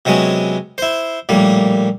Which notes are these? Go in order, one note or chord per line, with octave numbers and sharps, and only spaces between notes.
C3 F#3 G#3 B3 C#4
E4 C5
A#1 A2 G3 A#3